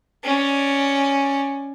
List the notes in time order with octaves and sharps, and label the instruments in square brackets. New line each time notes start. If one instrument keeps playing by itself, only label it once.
[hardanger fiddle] C#4 D5